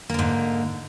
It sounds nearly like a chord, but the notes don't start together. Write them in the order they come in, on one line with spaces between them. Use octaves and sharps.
A#3 D3 G#2